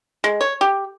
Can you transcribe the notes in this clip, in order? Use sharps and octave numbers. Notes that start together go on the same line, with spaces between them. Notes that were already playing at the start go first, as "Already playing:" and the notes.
G#3
C#5
G4